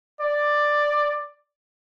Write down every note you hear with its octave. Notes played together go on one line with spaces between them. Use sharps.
D5